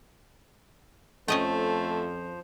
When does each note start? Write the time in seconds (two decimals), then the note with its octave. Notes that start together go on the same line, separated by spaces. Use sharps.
1.28 F2 F3 A3 C#4 C5 D#5 G5